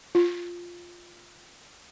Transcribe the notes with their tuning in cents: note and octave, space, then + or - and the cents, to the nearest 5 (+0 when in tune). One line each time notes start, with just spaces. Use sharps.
F4 +0